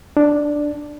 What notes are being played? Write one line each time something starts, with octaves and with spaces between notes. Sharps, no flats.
D4